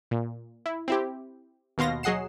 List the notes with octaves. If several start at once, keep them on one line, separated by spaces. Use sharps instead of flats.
A#2
E4
C4 E4 G4
D#2 B2 F5 C6 A#6
F#3 G#4 D#5 F#5 C7 E7